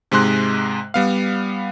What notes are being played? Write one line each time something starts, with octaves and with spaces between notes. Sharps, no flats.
G#2 C3 G#3 C6 F#6
G3 B3 F5